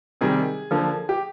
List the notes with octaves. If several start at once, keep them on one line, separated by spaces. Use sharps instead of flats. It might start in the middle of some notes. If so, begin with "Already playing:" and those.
C3 D#3 G3 G#4
D3 F3 A#3
G4